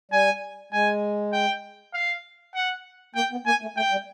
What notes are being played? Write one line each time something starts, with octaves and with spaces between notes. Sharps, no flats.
G3 G#5
G#3 G#5
G5
F5
F#5
A#3 G5
B3
A#3 G#5
A3
A3 G5
G3